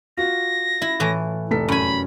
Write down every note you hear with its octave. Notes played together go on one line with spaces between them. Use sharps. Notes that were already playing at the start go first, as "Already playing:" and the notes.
F4 F#4 A#6
E4
A2 E3
F1 A4 B6
F#2 G#5 B5